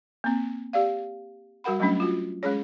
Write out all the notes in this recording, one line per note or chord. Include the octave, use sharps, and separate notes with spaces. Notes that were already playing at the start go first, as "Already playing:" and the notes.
A#3 C4
G4 D5 F5
G3 F#4 A#4 F#5 B5
F#3 G3 A3 C#4 D4
F4 F#4
G#3 C#4 G#4 C#5